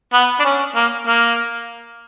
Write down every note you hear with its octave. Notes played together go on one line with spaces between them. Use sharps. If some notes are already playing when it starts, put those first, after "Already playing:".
B3
D4
C#4
A#3
A#3